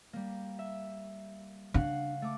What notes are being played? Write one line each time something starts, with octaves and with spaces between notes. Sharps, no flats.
G3 A#3
E5
C#3 D4 F5 F#5
A3 D6